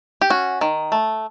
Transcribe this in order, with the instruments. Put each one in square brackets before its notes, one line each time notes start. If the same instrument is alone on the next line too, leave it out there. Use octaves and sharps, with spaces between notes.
[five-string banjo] G4
C#4 F#4
D#3
A3